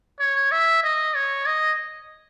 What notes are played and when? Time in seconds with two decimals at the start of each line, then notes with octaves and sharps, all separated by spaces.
0.19 C#5
0.52 E5
0.83 D#5
1.15 C#5
1.46 D#5